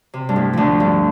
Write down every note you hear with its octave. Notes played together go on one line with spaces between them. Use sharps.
C3
G2
A2
D2 D3 F3
G2